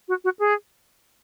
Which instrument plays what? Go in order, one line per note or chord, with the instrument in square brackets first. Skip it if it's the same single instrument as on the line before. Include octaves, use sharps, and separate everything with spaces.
[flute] F#4
F#4
G#4